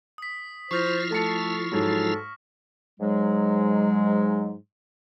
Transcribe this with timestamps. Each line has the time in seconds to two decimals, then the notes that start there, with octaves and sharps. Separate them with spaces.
0.18 D#6 B6
0.71 F3 E4 F4 C5 C#6 F6 A#6
1.10 A3 A4 A5 C#7
1.72 G#2 F#3 A4
3.00 G#2 F#3 G#3